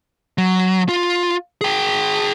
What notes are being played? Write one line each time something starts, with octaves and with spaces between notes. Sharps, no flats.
F#3
F4
G#4 G5